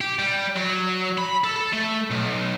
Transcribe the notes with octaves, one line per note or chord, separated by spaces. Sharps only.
G4
G3
F#3
B5
A4
A4
A3
B1